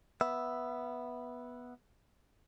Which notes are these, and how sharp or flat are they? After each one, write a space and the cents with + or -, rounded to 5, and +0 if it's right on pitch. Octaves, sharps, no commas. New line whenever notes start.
B3 -5 E5 +0